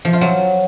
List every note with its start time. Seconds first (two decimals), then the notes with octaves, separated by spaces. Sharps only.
0.05 F3
0.13 F4
0.21 F#3